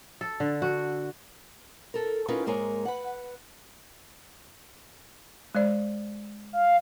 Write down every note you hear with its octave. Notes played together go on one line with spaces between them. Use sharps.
A4
D3
F#4
A4 A#4
C#4 D#4 F4 A#4 B4
G#2 G#3 A#3 A#4 C#5 G#5
B4 F#5
G#3 C5 D5
F5